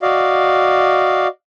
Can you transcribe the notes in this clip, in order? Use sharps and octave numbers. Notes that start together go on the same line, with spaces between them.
F#4 D5 D#5 F5